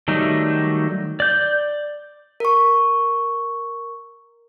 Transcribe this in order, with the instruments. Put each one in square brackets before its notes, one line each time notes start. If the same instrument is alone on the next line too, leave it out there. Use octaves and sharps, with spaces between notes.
[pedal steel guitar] D#3 F#3 G3 A3 D#4
D5 G6
[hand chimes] A#4 C#6